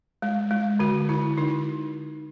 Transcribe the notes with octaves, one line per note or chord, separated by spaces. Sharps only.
G#3
G#3
D3 F#4
D3 E4
D3 D#4